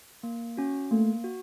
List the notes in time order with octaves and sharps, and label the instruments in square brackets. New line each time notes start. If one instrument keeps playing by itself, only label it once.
[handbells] A#3
C#4 F#4
[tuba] A3 [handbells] A#3
[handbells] F#4